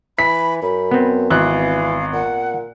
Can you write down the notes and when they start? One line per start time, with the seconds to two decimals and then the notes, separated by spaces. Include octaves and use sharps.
0.19 E3 B5 B6
0.63 F#2 B5
0.91 B3 C4
1.30 G#1 E3 F5 F#6
2.13 A#2 F#5